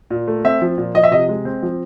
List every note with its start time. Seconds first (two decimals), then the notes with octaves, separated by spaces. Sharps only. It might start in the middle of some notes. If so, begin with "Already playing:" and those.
0.11 A#2
0.28 A3
0.44 C4 E5
0.62 F3
0.78 A#2
0.95 F3 D#5
1.03 E5
1.11 C3 D#5
1.29 G#3
1.45 C4
1.63 F3